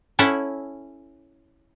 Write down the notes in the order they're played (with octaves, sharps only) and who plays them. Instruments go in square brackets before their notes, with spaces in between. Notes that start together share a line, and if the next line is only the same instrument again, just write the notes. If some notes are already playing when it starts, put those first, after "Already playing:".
[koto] C#4 E4 A4 E5 F#5